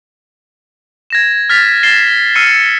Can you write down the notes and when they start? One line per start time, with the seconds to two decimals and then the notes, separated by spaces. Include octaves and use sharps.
1.10 G#6 A#6 E7
1.49 F6 A6 B6 F7
1.83 A6 C7 E7 G7
2.35 E6 F6 C7 C#7 D#7 G7